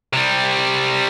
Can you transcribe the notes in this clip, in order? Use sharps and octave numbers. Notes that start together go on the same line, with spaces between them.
C3 G3